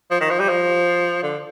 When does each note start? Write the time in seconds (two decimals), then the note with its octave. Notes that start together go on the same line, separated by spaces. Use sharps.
0.11 F3
0.21 D#3
0.30 F3
0.40 G3
0.49 F3
1.23 D3